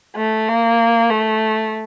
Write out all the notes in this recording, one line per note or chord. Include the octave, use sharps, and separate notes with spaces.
A3
A#3
A3